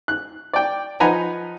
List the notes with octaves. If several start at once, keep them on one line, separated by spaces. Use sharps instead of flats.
F#6
D5 G5
F3 D#4 B4 F#5 G#5 A#5